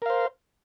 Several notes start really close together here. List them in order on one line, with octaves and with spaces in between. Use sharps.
A#4 F5 C5